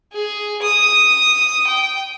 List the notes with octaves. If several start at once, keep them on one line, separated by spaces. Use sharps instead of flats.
G#4
D#6
G5